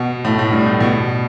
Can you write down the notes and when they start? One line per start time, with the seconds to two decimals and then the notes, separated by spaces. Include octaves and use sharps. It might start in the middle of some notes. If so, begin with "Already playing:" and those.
Already playing: B2
0.25 A2
0.39 A2
0.52 G2
0.67 A2
0.81 B2